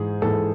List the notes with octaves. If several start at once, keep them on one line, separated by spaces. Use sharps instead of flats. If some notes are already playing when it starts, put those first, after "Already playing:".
Already playing: G#2 E3 G#4
G#2 E3 A4